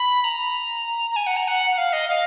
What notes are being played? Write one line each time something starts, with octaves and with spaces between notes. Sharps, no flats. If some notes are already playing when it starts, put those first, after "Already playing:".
Already playing: B5
A#5
A#5
G#5
F#5
A#5
F#5
F#5
F5
D#5
F5